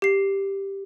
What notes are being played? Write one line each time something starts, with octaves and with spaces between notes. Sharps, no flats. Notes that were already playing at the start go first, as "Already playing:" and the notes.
G4 C7